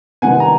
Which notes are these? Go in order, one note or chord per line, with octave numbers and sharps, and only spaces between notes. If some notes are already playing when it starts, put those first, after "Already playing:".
C2 C3 D#3 G#3 B3 F#5 G#5
A#5